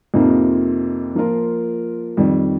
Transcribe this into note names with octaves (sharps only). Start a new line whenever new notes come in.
F2 C3 F3 A#3 D#4
F3 A#3 F4 A#4
F2 D#3 G3